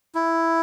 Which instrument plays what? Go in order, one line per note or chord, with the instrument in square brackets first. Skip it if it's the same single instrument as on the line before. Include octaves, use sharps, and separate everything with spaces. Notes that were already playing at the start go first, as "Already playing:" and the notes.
[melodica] E4